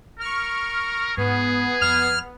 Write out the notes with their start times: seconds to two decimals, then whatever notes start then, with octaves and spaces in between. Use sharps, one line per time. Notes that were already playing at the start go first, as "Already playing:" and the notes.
0.20 A#4 C#6 F6
1.17 G#2 B3 G#4
1.81 F2 F6